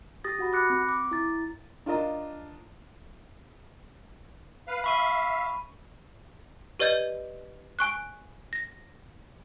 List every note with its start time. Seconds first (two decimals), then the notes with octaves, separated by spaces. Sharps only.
0.24 G4 D#6 A6 A#6
0.39 F#4 F#5 B5
0.53 B5 D6 F#6 A#6 C#7
0.70 C4
0.89 D6
1.11 E4 A#5 A6
1.86 D4 F4 A#4 D#5
4.67 B4 F5
4.84 E5 F5 B5 C#6 D#7
6.79 G4 B4 D5 D#5 G6 G#6
7.79 G#5 C#6 F#6
8.53 A#6